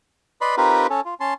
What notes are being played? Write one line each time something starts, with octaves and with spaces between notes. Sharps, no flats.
B4 D5 D#5 B5 C6
C4 D#4 F4 G4 A#4 B4
C#4 A4
F4
C#4 A5 C6